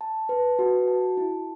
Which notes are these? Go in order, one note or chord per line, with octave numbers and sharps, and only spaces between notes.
A5
B4
F#4
A5
E4